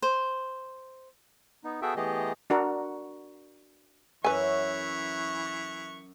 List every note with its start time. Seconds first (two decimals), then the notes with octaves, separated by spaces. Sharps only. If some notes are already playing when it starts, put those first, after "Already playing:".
0.02 C5
1.64 B3 D#4
1.82 B3 F#4 G#4 A4 E5 G5
1.96 E3 A3 B3 G4 G#4 D#5
2.50 D4 F#4 A#4
4.24 F#2 E3 B4 E5 G#5 C#6